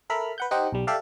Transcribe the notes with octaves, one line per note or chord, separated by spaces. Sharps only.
A4 A#4 E5 B5 F6
B4 F#5 G6
D#4 G4 C5 D#5 F#5 G5
B1 G3
G4 A4 D5 E5 F5